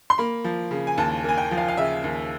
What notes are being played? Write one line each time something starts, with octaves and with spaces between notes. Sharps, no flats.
C6
A#3 B5
F3
C#3
G#5
D#2 A5
A#3 G#5
G5
F3
F5
F5
C#3 E5
D#2